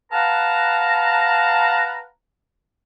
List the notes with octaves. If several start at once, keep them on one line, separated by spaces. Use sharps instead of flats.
B4 F5 F#5 A5 A#5